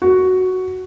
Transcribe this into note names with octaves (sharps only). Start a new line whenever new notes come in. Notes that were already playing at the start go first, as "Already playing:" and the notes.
F#4